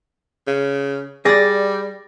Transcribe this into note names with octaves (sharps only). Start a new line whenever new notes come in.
C#3
G3 G#4 D5 A6 A#6